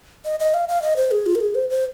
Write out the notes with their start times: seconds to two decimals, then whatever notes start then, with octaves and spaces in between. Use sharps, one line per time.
0.25 D#5
0.40 D#5
0.54 F5
0.69 F5
0.82 D#5
0.97 C5
1.11 G#4
1.26 F4
1.35 A#4
1.41 G#4
1.55 C5
1.70 C5